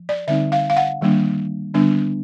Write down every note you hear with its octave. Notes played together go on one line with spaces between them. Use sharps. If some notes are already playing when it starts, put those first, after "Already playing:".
Already playing: F3
D5
D3 G3 C4 D#4 E5
F5
F5
F#5
D#3 G3 A#3 D4
D3 G3 B3 D4